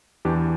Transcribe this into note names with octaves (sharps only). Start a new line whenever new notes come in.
E2 E3 D4 G4